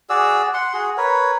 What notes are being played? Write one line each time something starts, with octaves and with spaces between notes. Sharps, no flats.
F#4 G#4 D5 E6
F#5 C6
F#4 G#4
A#4 B4 C#5